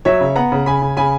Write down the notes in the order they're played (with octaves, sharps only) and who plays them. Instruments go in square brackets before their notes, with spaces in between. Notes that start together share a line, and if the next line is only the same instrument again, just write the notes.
[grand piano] F#3 C#5 E5
C#3
B3 F#5 A#5
C#3
C#3 G#5 B5
C#3
C#3 G#5 B5